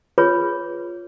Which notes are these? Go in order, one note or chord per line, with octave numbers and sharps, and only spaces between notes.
F4 G#4 B4 C#5